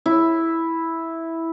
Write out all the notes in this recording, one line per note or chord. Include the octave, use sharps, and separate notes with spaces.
E4